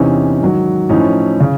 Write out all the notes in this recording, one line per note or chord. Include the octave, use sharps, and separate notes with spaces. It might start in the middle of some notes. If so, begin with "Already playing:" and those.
Already playing: E2 C3 E3 C#4 D#4
G#2 D#3 F#3
A2 F3 C#4 D#4
C#3